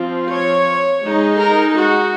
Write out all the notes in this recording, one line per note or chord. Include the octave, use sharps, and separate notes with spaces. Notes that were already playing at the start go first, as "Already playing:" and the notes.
Already playing: F3 C4 F4
C#5
G#3 D#4
A#4
F#4